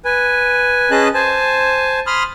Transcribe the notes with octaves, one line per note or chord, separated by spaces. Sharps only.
B4 G#5
C#4 G#4 B4 D#5 A5 F#6
C5 G#5 A5
B5 C6 D#6 F6